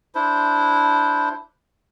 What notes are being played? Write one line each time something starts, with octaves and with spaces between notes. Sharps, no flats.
D4 E4 C5